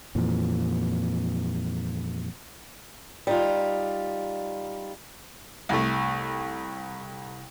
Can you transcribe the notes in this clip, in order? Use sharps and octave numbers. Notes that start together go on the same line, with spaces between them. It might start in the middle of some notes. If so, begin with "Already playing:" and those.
F2 A#2 E3
G3 D#4 F4
C2 A3